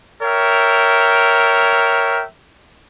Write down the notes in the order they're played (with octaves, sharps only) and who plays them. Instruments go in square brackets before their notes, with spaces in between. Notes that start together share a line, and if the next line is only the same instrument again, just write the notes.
[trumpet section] A#4 C#5 E5 G5